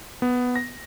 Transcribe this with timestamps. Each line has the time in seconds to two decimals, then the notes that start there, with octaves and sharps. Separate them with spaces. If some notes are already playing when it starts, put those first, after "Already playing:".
0.22 B3
0.56 A#6